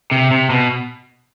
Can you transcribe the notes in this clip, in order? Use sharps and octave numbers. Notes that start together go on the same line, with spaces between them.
C3
C3
B2